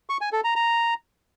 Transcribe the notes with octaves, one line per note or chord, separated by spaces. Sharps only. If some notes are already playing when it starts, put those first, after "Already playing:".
C#6
G#5
A4
A#5
A#5